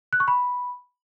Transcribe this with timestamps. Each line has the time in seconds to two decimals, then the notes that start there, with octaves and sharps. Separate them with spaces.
0.13 F#6
0.20 C#6
0.28 B5